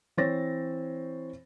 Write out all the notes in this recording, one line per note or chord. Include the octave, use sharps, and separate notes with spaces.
E3 C4 C5 C#5 A6 A#6